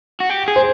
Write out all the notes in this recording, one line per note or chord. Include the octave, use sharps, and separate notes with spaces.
F#4
G4
G#4
C5